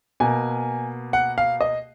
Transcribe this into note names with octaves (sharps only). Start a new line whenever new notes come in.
B2 A#3 G#5
F#5
F5
D#5